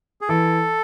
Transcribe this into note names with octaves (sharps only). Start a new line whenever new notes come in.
G#4
E3 A4